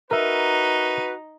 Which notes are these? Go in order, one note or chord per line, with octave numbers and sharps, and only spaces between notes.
D#4 F#4 A#4 B4 E5